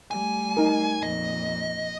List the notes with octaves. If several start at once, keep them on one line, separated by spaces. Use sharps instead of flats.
G3 A3 G#5
D#4 A#4
F2 A#2 D#5